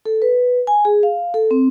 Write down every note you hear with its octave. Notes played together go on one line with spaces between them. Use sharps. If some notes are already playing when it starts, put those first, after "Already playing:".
A4
B4
G#5
G#4
F5
A4
C4